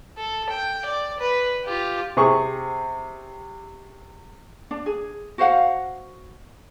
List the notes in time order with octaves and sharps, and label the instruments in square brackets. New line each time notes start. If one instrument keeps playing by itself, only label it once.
[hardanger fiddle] A4
G5
D5
B4
F4 G4
[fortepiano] C3 G#4 C#6
[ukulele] D4
G#4
F#4 C5 F5 F#5